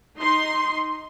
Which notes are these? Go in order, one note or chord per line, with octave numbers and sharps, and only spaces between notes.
D#4 C6